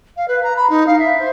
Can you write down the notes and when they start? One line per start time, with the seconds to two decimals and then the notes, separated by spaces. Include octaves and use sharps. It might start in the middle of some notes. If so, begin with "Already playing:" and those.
0.16 F5
0.28 B4
0.43 A#5
0.56 B5
0.69 D#4
0.86 F5
0.98 E5
1.19 C5